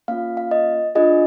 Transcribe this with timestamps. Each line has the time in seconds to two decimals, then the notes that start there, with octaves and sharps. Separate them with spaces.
0.08 A#3 C#4 F4 F5
0.37 F5
0.51 D#5
0.95 D4 F4 G#4 D#5